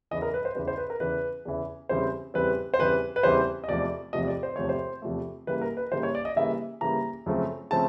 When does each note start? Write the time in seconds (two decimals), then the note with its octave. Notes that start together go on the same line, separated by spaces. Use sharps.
0.11 E2 C#3 E3 D#5
0.22 A#4
0.34 B4
0.45 C5
0.55 E2 C#3 E3 B4
0.68 C5
0.78 B4
0.90 A#4
1.00 E2 C#3 E3 B4
1.45 E2 C#3 E3
1.89 E2 C#3 E3 G3 C4 C5
2.34 E2 C#3 E3 G3 C4 B4
2.74 C5
2.79 E2 C#3 E3 G3 C4 B4
3.16 B4
3.23 E2 C#3 E3 G3 C4 C5
3.64 D#5
3.68 E2 C3 F3 A3 D5
4.13 E2 C3 F3 A3 D#5
4.28 D5
4.43 C5
4.56 E2 C3 F3 A3 C#5
4.69 C5
5.02 E2 C3 F3 A3
5.47 C#3 E3 G3 A#3 B4
5.62 A#4
5.77 B4
5.92 C#3 E3 G3 A#3 C5
6.03 C#5
6.15 D5
6.25 D#5
6.36 C#3 E3 G3 A#3 E5
6.81 C#3 E3 G3 A#3 A#5
7.26 F#2 C#3 F3 A3 C4
7.71 C#3 F3 A3 C4 A5